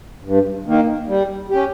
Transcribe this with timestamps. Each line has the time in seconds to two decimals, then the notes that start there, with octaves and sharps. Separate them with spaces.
0.24 G2
0.66 D#3 A#3
1.08 G3
1.50 C#4 G4